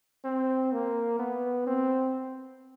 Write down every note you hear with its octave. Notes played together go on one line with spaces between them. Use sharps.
C4
A#3
B3
C4